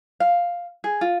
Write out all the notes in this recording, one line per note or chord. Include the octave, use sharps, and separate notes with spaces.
F5
G#4
F4